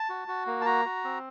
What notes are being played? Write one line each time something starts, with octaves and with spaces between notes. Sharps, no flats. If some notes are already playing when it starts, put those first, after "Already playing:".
Already playing: A5
F#4
F#4
A#3
A5
F#4 A#5
F#4
C4